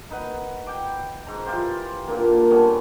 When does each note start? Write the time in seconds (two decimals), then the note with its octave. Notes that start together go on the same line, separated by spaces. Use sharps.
0.11 D#4 B4 F#5
0.66 G5 D6
1.26 G#2 A#5
1.46 E3 F4 G4 C5
2.08 A#2 D3 A#3
2.51 G3 B3 C#4 A4